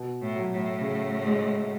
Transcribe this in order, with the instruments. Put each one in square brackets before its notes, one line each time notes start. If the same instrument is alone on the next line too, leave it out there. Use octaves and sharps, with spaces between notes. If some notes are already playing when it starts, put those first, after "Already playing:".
Already playing: [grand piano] B2
[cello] A2
[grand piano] F#3
[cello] A2
[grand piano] C#3
G#3